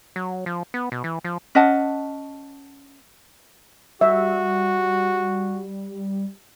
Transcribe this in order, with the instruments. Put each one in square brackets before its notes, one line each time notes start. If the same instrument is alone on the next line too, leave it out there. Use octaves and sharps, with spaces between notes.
[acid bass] F#3
F3
B3
B2
E3
F3
[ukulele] C#4 D#5 F#5 A5
[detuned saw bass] G3 [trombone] F#4 [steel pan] E5